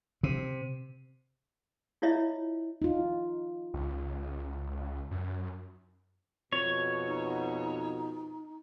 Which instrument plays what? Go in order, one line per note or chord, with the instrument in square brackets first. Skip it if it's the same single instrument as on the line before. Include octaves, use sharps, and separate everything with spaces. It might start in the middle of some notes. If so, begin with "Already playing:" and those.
[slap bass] C3
[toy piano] E4 F4 C#5 D#5 E5
[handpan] D#4 F4
[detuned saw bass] C#2
F#2
[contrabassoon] F2 [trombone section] B2 [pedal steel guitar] C#5
[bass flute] D#4